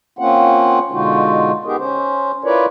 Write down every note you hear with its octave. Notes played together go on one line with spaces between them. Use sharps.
A#3 C4 C#4 F4 F#5
B2 D3 G#3 D#4 F4 F#4
B3 D#4 G4 G#4 A#4
C#4 C5
E4 F4 A#4 B4 C#5 D5